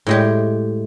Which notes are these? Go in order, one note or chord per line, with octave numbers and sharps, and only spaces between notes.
A2 G#3 G4